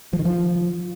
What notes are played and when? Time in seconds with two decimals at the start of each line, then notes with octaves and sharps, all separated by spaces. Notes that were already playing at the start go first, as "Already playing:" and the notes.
0.13 F3
0.19 D#3
0.25 F3